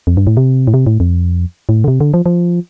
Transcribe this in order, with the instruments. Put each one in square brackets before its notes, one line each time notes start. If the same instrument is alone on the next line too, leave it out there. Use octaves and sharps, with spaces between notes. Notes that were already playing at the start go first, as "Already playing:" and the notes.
[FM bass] F2
G2
A2
C3
A2
C3
A2
F2
A2
D3
C3
D3
F3
F3